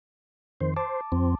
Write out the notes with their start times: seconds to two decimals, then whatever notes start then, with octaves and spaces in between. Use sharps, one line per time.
0.61 F2 D#3 C5
0.76 C5 A5 D6
1.12 F2 C4